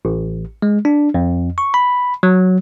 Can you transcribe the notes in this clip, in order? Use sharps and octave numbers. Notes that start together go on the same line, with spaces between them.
A1
G#3
D4
F2
C#6
B5
F#3